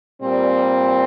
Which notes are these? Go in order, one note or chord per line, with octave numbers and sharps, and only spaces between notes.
A#2 G3 C4